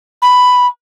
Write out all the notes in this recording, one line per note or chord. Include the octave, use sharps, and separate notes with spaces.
B5